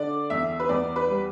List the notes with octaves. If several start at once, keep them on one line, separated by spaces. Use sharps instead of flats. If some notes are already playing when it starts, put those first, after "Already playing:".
Already playing: D3 D5
E2 E5
B4
E2 D5
B4
G3